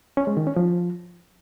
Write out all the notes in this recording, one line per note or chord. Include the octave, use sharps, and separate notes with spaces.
C#4
G#3
D#3
C#4
F3